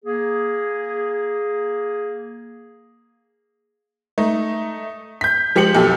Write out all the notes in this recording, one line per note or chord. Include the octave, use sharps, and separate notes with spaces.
A#3 G#4
A3 D#4
G6 B6
F3 G#3 G4 C#7 F#7
B1 F2 G4 A4